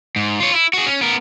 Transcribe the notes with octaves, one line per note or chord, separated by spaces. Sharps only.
G#2
F4 C#5
E4
F#4 G#4
C#4
B3 A#4